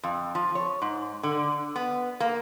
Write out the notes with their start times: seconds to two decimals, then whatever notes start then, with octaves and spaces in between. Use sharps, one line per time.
0.03 F2
0.35 F3
0.55 C#5
0.82 G#2
1.23 D3
1.76 B3
2.20 A#3